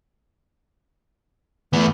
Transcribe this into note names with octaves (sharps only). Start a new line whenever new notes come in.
E2 A3 B3